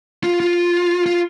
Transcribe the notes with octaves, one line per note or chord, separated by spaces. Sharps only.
F4
F4
F4